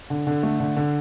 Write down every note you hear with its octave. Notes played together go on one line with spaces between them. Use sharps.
D3
D3
A3
D3
D3